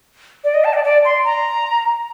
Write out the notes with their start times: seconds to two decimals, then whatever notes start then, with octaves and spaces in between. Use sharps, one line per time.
0.44 D5
0.54 D#5
0.65 A5
0.74 D5
0.84 D5
1.05 C6
1.25 A#5